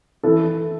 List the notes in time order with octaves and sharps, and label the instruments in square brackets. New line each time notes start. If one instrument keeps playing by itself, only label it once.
[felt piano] E3 [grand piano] A4